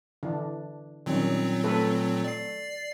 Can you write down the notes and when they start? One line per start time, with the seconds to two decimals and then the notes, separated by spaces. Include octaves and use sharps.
0.23 D3 E3 D4
1.06 A#2 D#3 F#3 G3 C4 C#4
1.64 A3 A4 B4
2.24 D5 C7